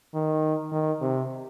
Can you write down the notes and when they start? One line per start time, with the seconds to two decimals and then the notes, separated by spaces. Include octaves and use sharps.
0.14 D#3
0.72 D#3
1.01 C3